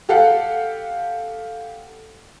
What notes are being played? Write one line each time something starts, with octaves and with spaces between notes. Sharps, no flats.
G4 A4 F5 F#5